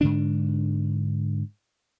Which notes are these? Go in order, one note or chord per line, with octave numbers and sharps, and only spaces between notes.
G#2 D3 D4